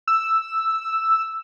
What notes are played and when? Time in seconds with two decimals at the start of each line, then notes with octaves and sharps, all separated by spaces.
0.08 E6